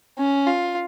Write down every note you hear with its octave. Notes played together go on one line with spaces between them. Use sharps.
C#4
F4